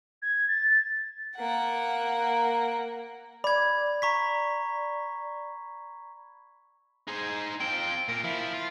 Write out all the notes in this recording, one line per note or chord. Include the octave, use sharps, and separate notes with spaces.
G#6
A6
A6
A#3 F#5
D5 B5 G#6
A#5 C#6 B6
D#4 G#4 C5
F3 C4 G5
A#2 F4 A#4
F3 E4
F4